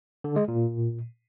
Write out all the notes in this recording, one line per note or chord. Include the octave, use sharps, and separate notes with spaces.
D3
G#3
A#2